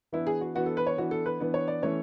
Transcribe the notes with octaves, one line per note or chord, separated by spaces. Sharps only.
E3 B3 D4 E4
G#4
F#4
E3 B3 D4 F#4
A4
B4
C#5
E3 B3 D4 F#4
A4
B4
E3 B3 D4
C#5
D5
E3 A3 C#4 C#5